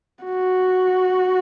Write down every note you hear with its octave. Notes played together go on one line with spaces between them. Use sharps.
F#4